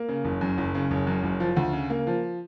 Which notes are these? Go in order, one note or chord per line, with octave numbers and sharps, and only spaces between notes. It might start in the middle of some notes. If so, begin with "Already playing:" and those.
Already playing: A#3
C#3
F#1
F#2
F#1
C#3
F#1
F#2
F#1
F3
D2
C#3
A#3
F3